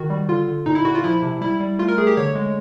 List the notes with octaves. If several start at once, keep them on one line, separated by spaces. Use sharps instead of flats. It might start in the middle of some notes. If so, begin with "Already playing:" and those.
Already playing: D#3 F#4
G3
D3 F4
D3
A#2 D#4
E4
A#2 F#4
F4
F3 E4
C3
G3 E4
G3
A3 F4
A#4
A3 G#4
G4
D3 C#5
G#3